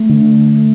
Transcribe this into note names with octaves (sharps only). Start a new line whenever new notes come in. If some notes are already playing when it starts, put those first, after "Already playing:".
Already playing: A3
D3